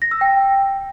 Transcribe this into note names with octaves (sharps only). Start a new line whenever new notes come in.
A#6
E6
G5